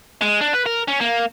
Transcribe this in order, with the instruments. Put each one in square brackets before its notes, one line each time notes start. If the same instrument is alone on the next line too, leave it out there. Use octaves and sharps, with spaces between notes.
[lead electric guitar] G#3
D4
B4
A#4
C#4
A#3